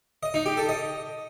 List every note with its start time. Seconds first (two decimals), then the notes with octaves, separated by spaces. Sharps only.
0.23 D#5
0.34 D#4
0.46 G4
0.57 A4
0.69 D#5